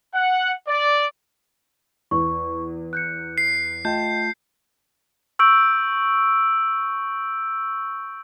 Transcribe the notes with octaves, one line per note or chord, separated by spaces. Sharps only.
F#5
D5
E2 C#6
F#6 G6 C#7
C7
A3 F4 D#5 G5 A5 G6
C#6 E6 G6 D7